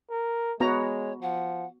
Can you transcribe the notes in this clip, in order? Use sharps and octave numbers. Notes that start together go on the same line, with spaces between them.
A#4
G#3 B3 F#4 C#5 A#5
F3 F#5